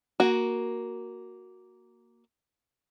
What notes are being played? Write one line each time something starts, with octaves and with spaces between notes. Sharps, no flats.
A#3 F#4